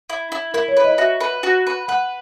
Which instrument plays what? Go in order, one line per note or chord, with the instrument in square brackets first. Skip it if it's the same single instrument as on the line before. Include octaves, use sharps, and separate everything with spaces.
[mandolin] E4
E4
[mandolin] E4 [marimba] A#4
[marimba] C#5
[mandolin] B4
[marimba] D#5
[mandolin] F#4 [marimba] E5
[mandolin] B4
F#4
B4
[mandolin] B4 [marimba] F#5